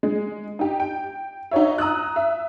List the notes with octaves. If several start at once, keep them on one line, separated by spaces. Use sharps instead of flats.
G#3
D#4 G4
G5
D#4 F#4 C#5 E5
A#5 D#6 E6 F#6
E5